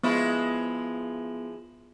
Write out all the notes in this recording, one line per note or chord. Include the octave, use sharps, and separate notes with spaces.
F3 G#3 B3 E4